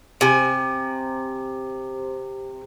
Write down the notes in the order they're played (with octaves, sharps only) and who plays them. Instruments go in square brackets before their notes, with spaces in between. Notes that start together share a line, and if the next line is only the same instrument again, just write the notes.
[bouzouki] C3 G#5